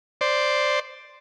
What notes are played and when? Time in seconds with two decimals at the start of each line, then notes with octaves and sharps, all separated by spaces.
0.21 C5 D5